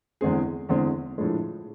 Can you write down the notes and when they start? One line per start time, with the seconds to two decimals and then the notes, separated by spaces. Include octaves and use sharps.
0.21 E2 D3 G#3 C4 G#4
0.69 E2 D3 G#3 C4 G#4
1.18 A2 F3 G#3 D4